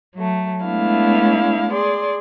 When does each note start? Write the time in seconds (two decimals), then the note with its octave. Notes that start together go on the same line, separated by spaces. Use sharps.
0.15 F#3 A3
0.64 G#3 A3 B3 D4 E4 F5
1.72 G#4 D5 C6